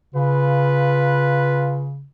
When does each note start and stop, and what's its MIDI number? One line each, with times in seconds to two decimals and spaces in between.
0.15 2.06 49
0.15 1.88 65
0.15 1.88 71